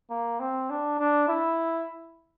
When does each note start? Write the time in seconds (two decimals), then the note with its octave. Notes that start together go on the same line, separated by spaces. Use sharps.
0.11 A#3
0.40 C4
0.70 D4
1.00 D4
1.28 E4